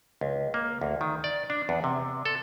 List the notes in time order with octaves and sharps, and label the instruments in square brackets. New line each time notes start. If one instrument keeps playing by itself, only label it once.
[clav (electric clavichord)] C#2
A#3
D2
D#3
D5
D4
E2
C3
A4